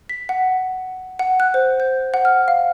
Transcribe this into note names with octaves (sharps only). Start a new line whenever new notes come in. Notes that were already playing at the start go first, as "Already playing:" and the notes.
B6
F#5
F#5
F#6
C5
G6
F#5
F6
F5